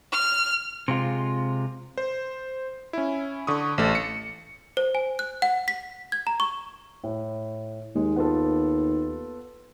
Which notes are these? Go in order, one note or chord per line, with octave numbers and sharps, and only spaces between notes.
F6
C3 G#3 F4
C5
C#4 E4
D3 C#6 D#6
A1 A3
C#7
C5
G#5
F#6
F#5
B6
G#6
A#5
C#6
A2
D#2 G#3
B3 F4 A4